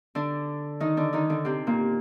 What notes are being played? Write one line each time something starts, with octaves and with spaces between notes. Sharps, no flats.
D3 D4
D#3 D#4
D3 D4
D#3 D#4
D3 D4
C3 C4
A#2 A#3